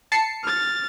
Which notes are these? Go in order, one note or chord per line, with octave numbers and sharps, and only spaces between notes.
A5 C7 C#7
F6 A6